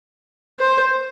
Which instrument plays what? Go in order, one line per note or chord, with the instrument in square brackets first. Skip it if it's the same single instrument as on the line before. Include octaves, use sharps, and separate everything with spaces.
[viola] C5